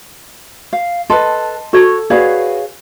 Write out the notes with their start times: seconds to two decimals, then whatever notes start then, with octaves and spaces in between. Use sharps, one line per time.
0.73 F5
1.10 A4 B4 D#5 A5 C6
1.73 F#4 A4 C#5
2.10 F#4 G#4 B4 C#5 D5 F5